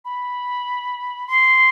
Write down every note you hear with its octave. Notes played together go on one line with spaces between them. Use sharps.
B5
C6